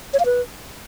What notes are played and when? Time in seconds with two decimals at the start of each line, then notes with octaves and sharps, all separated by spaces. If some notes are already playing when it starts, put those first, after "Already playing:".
0.13 C#5
0.20 F5
0.26 B4